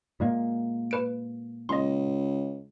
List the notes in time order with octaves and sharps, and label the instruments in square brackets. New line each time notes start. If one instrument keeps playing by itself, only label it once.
[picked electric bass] A#2 G#3 A#3
[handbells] B4 D7
[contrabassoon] C#2 [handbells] D#5 C6